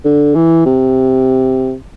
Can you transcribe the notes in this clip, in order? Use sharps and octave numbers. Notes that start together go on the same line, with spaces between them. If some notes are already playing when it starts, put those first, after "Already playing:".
D3
E3
C3